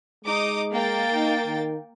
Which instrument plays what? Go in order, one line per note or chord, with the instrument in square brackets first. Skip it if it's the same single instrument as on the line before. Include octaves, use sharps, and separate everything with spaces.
[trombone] G#3 [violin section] D#4 D6 D#6
[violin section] A#3 G5 A6
[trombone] D#4
D#3